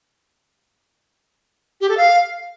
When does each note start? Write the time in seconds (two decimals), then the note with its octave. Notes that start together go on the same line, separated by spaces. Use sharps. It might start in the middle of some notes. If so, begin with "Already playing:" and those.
1.81 G4
1.89 A4
1.97 F5